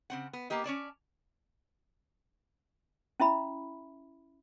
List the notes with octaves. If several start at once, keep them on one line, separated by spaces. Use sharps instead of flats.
C#3 C4 F#5
B3
A#3 B3 G4 D#5
C#4 C#5 D5 A5
C#4 E4 E5 B5